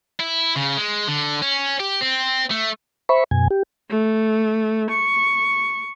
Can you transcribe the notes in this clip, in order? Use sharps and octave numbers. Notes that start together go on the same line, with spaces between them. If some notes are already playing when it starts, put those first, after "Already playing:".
E4
C#3
G#3
D3
C#4
G4
C4
A3
C5 E5 B5 C#6
F#2 B2 G#5
G4
A3
C#6